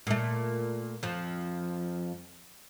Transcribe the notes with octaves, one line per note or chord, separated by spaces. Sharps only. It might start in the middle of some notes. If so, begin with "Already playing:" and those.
A#2 A3
F2 F3